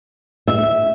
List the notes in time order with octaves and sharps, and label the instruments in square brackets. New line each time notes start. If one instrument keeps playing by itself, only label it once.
[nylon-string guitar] E5